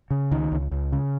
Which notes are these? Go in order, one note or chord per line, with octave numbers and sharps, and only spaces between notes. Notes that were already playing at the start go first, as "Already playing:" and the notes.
C#3
C#2 D#3
C#2
C#2
C#3